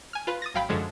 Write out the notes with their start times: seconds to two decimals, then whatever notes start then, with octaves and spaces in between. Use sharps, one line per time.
0.13 G#5 F6
0.27 F4 B4
0.42 D#6 A6 A#6
0.54 A1 F#3 F5 G5 B5
0.69 F#2 D3 F3 F#3 G#3